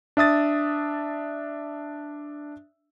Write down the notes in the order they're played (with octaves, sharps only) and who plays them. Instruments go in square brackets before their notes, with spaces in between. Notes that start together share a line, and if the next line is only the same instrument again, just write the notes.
[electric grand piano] D4 E5 D#6 A6